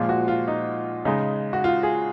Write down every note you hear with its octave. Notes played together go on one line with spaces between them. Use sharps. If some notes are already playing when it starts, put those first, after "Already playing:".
Already playing: A#2 F3 G#3 F4
F#4
F4
D#4
C#3 G#3 D#4
F#4
F4
G#4